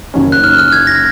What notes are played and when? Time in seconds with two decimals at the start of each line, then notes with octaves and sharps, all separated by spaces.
0.14 F#1 F#2 D#3 A#3 C#4
0.32 F#6
0.44 F6
0.58 F6
0.72 G#6
0.87 A#6